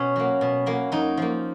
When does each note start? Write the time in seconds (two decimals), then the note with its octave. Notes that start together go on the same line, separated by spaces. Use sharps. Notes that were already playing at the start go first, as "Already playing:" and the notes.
Already playing: B2 C#4
0.16 F#3 A#3
0.41 B2
0.66 F#3 A#3
0.92 F#2 D#4
1.17 F3 A#3